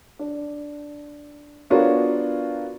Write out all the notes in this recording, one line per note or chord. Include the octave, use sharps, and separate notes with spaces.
D4
B3 D4 F4 F#4 A#4 C#5